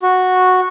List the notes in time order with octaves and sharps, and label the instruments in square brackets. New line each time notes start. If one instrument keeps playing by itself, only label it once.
[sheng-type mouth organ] F#4